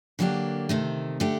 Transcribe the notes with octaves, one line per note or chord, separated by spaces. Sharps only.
D3 F#3 A#3 D4 G4
C3 D#3 A3
D3 A3 D4 G4